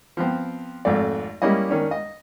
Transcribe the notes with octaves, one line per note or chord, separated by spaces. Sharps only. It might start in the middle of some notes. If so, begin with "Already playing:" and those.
F3 B3 C4
G#1 F2 A3 D5
G3 A#3 C#4 E4 D#5
D#3 C#4 D4
D#5